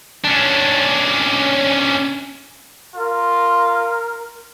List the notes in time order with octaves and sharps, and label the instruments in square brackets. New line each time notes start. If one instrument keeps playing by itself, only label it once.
[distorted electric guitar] C#4 D4
[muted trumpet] F4 [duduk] A#4